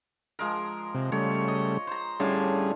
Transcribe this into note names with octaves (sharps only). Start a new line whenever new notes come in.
F3 G#3 A#4
C3
C#3 G3 A3 C#5
D#5
C5 A#5
A2 D3 G3 C#4 G#4 F5